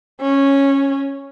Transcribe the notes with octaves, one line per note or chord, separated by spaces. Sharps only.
C#4